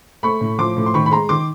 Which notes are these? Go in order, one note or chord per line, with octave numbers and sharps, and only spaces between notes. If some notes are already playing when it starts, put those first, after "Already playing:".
A3 B5 C#6
A2
F3 C6 D6
A2
C6
D#3 B5 C#6
B5
G#3 A#5 C6
D#3 C6 D6